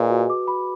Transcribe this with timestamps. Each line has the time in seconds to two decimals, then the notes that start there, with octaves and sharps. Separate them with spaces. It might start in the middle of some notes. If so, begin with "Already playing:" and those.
Already playing: A#2 G#4 B4 D#5 G#5
0.10 F#4
0.30 D6
0.48 B5